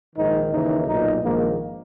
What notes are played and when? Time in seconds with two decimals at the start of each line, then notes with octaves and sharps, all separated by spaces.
0.14 A#1 G#2 D#3 D#4
0.50 D#2 C#3 E3 D#4
0.86 B1 A#2 D#4
1.22 A#1 G#2 D#3 A#3